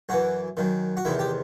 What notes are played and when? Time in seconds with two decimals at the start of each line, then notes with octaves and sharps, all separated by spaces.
0.09 F#2 E3 F#4
0.57 F#2 D#3
0.97 F#4
1.05 E2 C3 D#3 E4
1.19 G4